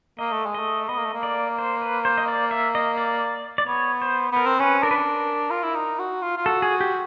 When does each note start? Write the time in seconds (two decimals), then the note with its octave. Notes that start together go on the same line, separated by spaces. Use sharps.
0.19 A#3 D#5
0.32 A3
0.46 G#3
0.54 D#5
0.60 A3
0.89 B3 D#5
0.97 A#3
1.05 A3
1.14 A#3
1.23 D5
1.58 C5
1.82 B4
2.05 C5
2.18 D#5
2.28 D5
2.51 E5
2.75 D#5
2.97 D5
3.58 D5
3.67 B3 C#5
4.02 C5
4.32 B3 A#4
4.46 C4
4.59 C#4 B4
4.83 D4 A#4
4.91 B4
4.98 A#4
5.51 F4
5.63 E4
5.76 D#4
5.99 F#4
6.22 F4
6.37 F4
6.46 F#4 A4
6.62 G#4
6.80 G4